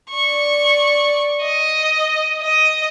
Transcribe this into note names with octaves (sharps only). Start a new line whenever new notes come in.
D5 C#6
D#5
D#5